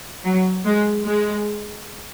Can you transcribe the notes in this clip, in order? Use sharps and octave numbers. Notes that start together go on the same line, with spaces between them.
F#3
G#3
G#3